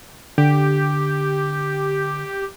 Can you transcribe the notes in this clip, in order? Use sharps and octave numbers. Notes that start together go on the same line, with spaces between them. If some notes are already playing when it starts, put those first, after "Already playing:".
D3 G4